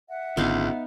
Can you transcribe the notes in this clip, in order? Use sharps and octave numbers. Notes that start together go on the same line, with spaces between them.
E5 F#5
G#1 C#2 D3 B3 D#4 F5